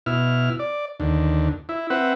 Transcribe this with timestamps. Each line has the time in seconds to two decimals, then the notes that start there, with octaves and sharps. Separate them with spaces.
0.06 B2 E4 F6
0.59 D5
1.00 D#2 D3
1.69 E4
1.90 C4 B4 E5 F#5